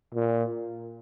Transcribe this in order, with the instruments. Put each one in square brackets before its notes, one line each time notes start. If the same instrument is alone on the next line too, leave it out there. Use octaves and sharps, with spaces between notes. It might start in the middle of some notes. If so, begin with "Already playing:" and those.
[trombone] A#2